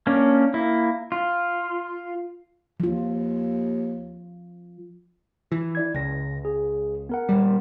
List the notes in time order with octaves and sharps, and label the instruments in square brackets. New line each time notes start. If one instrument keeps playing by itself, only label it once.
[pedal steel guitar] A#3 C#4 D4
A#3 E4
F4
[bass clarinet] D#2 [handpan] F3 F4
[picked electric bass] E3
[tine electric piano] E4 D5 G#6
[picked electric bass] C#2 [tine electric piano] C#3 A#6
[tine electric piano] G#4
B3 A#4 F#5
[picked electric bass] D#1 G3